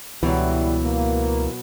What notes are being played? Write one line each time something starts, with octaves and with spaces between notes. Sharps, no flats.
C#2 B2 D3 E3 F#3 G3 E4
A#3